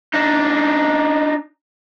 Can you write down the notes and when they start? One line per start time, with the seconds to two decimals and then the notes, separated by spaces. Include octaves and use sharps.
0.14 D4 D#4